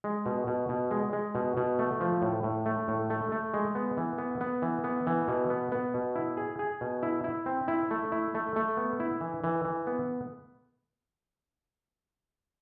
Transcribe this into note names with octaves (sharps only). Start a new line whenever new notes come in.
G#3
B2
B2
B2
G#3
G#3
B2
B2
A3
F3
A2
A2
A3
A2
A3
A3
G#3
B3
E3
B3
B3
E3
B3
E3
B2
B3
B3
B2
E4
G#4
G#4
B2
E4
E4
C4
E4
A3
E4
A3
A3
B3
E4
E3
E3
E3
B3